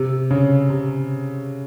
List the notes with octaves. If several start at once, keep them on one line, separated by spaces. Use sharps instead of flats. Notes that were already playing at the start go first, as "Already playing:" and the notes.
Already playing: C3
C#3
C3